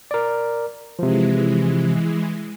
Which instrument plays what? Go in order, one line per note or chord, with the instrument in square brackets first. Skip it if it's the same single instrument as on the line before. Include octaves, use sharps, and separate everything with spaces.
[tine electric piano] A#4 D5
[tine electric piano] C3 F3 [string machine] E3 G#3